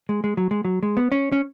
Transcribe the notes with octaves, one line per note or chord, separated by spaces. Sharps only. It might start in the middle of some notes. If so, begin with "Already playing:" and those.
G#3
G#3
F#3
G#3
F#3
G#3
B3
C#4
C#4